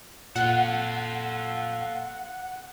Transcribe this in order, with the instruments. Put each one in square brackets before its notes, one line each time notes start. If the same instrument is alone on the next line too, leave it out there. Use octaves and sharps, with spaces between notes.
[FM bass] A#2 [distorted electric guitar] F4 A4 [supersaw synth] F#5